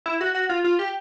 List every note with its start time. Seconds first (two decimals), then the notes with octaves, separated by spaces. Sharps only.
0.06 E4
0.21 F#4
0.34 F#4
0.49 F4
0.64 F4
0.79 G4